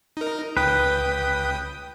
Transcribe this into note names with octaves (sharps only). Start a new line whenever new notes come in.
D#4 A#4
C#2 B4 G5 D#6